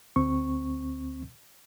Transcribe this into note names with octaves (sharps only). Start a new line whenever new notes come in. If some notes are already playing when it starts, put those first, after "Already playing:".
D2 C4 C#6